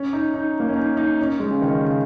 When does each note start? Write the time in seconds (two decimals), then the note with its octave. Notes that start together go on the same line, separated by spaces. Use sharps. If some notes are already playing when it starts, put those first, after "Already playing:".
Already playing: C#4
0.13 D#4
0.34 D#4
0.60 A#3
0.69 C#4
0.76 D#4
0.97 D#4
1.19 C#4
1.40 G#3
1.51 C#3
1.61 D#3
1.82 C#3